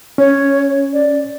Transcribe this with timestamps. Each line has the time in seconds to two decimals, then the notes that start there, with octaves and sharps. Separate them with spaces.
0.18 C#4 C#5
0.93 D5